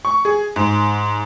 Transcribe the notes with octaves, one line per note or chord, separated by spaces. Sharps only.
C#6
G#4
G#2